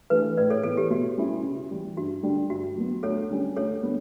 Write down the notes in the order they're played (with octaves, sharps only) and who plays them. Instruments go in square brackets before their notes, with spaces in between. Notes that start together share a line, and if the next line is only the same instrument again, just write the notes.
[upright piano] E3 A3 D4 G4 [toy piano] B4
[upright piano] A2 [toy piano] B4 D5
[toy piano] A4 C#5
[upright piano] E3 B3 E4 [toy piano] A4
[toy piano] G4
[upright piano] B2 [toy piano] F#4
[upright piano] G3 C#4 E4
C#3
E3 G3
[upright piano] G2 [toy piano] F#4
[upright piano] D3 G3 D4
[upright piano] G2 [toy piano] F#4
[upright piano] F#3 B3
[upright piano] D2 [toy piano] A4 C#5
[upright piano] D3 G3 C#4
[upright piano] D2 [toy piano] A4 C#5
[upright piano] D3 G3 B3